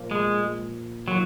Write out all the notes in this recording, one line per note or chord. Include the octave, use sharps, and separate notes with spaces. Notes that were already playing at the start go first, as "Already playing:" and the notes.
Already playing: A#2 F3 A#3
G#3
D#3 F#3 A#3 F4